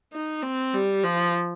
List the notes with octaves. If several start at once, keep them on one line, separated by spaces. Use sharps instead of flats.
D#4
C4
G3
F3